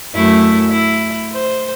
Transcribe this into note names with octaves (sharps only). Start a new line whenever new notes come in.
F#2 A3 E4
E4
C5